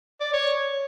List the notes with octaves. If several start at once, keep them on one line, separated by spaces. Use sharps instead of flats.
D5
C#5